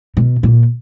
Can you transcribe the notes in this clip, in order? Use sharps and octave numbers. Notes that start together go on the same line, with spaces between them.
B2
A#2